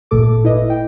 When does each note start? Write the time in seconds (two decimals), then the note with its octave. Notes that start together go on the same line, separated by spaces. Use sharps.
0.11 G#1 A#2 A3 A4 D6
0.44 E4 B4 D#5
0.70 G5